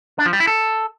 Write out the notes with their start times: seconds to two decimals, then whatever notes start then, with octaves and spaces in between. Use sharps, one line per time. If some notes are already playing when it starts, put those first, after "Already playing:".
0.18 D4
0.26 F3
0.33 G3
0.40 E4
0.47 A4